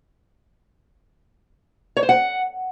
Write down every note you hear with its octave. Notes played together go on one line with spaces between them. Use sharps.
C#5
C5
F#5